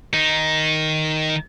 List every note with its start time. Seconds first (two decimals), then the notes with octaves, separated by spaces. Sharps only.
0.14 D#3 D#4